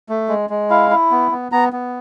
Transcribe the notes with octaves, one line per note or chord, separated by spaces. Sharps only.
A3
G#3
G#3
E4 F5
E4
B3
B3
B3 A#5
B3